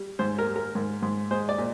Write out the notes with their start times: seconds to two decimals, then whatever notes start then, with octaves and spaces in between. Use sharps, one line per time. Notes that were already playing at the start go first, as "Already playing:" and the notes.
Already playing: G3
0.19 G#2 C5
0.39 A#4
0.47 G3
0.56 A#4
0.75 G#2
1.02 G#2
1.31 G#3 C5
1.49 D5
1.58 A#2